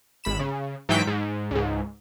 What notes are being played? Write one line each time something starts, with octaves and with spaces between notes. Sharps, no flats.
G#1 B5 E7
C#3
G#2 E3 F#3 G5 B6 D7
G#2
C#2 G#2